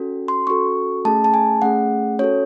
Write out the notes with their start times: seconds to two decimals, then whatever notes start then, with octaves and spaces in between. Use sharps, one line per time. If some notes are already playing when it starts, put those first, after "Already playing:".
Already playing: C#4 F#4 A4
0.28 C6
0.47 C#4 F#4 A4 C#6
1.05 A3 C#4 G#4 A5
1.24 A5
1.34 G#5
1.62 A3 C#4 G#4 F#5
2.19 C#4 F#4 A4 C#5